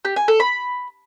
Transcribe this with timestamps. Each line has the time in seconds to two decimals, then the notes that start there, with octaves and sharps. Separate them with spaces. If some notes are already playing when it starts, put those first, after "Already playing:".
0.05 G4
0.16 G#5
0.28 A4
0.40 B5